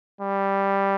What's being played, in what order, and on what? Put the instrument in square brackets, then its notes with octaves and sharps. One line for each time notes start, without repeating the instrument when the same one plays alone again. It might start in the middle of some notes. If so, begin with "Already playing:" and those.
[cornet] G3